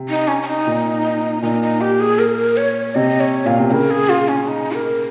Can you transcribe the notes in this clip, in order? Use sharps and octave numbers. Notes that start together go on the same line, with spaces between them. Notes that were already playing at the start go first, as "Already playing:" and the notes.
Already playing: C3
D#4
C#4
C#4
D#4
A#2
A#2 D#4
D#4
G4
G#4
A#4
C#5
C3 D#5
C#5
A#2 F5
C3
C#3 A#4
G#4
F4
C#4
D#4
A#4